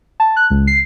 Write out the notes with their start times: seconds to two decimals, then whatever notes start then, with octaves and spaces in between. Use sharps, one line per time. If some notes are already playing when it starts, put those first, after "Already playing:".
0.20 A5
0.36 F#6
0.50 C#2
0.67 C7